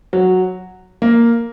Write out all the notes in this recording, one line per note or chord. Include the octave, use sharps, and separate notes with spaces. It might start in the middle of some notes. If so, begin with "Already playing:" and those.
F#3
A#3